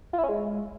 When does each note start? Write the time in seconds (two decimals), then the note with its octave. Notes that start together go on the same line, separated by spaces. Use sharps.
0.13 F4
0.18 E4
0.24 C#4
0.29 G#3